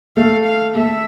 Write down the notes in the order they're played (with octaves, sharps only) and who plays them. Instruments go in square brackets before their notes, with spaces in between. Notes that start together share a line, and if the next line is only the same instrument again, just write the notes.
[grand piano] A3 A4 [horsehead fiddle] F5
[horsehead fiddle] F5
[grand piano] A3 A4 [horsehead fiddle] E5